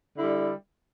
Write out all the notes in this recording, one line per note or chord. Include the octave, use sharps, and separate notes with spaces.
D3 G3 E4